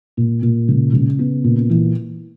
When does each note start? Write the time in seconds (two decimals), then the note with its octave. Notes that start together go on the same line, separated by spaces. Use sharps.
0.17 A#2
0.42 A#2
0.68 C#3
0.93 C#3
1.19 B3
1.44 A#2
1.70 E3